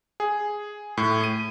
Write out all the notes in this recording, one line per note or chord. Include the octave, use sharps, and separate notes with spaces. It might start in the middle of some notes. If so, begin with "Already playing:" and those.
G#4
A2
D#7